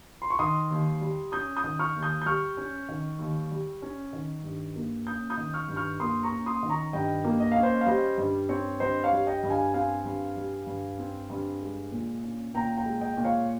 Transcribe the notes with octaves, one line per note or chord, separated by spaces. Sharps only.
C6
C#6
D#3 C6 D#6
D#2
G3
C#4 D#6 G6
D#6 G6
D#3
C#6 F6
D#2
D#6 G6
G6
G3 C#6 F6
C#4
D#3
D#2
G3
C#4
D#3
G2
A#3
C#4 D#6 G6
D#6 G6
D#3
C#6 F6
G2
C#6 F6
A#3 C6 D#6
A#5 C#6
C#4
C6 D#6
D#3
A#5 C#6
G2 D#5 G5
A#3
D#5
C#4 F5
C5 D#5
F5
G3 C5 D#5
G2
C4 C#5
G2 C5 D#5
C#5 F5
G3
D#5 G5
G2
F5 G#5
C4 F5 G#5
G2
G3
G2
C4
G2
G#3
A#2
C#4
A#2 G5 A#5
G5 A#5
G#3
D#5 G5
A#2
C#5 F5